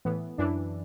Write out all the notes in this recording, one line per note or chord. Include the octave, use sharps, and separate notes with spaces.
A2 E3 B3
F#2 E3 D4